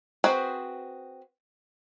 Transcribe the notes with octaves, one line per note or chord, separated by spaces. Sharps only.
C4 F#4 G#4 B4 C5